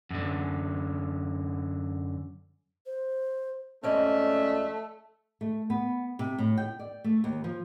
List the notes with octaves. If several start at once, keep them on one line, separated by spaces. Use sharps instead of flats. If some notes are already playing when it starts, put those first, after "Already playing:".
F#2 D3
C5
F2 G#3 A3 C#4 D5
A3
B3
C3
A2
G5
D5
A3
D#2
F3